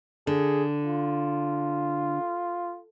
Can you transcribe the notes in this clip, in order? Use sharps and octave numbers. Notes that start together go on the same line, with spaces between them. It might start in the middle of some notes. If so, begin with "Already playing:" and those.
D3 G#4
F4